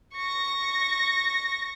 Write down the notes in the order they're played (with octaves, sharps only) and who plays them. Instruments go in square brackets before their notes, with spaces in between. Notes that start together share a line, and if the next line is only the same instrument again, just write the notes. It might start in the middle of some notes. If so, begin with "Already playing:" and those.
[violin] C#6 A#6